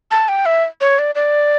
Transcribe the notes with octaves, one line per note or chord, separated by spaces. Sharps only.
A5
G5
E5
C#5
D5
D5